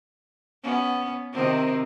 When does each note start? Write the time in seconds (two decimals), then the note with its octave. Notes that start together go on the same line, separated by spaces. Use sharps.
0.63 B3 C#4
1.33 C3 D#3 C4